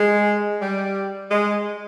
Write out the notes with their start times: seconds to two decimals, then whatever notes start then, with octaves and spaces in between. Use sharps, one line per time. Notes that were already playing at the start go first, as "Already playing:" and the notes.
Already playing: G#3
0.61 G3
1.30 G#3